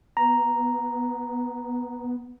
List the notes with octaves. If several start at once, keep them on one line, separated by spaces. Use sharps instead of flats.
B3 A#5